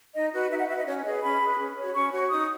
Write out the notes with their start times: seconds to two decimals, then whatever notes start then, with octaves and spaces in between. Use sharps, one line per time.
0.15 D#4 D#5
0.33 F#4 B4
0.50 D#4 E5
0.59 F#5
0.68 F#4 B4 E5
0.78 D#5
0.86 C#4 C#5
1.04 G#4 B4 D#5
1.22 C#4 B5
1.41 G#4 B4
1.58 C#4
1.76 F#4 C#5
1.95 C#4 C#6
2.12 F#4 C#5
2.30 D#4 D#6